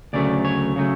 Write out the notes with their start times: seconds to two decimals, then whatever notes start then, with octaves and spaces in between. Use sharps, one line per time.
0.13 D2 C#3 F#3 A3 D5
0.45 C#5
0.76 C#3 F#3 A3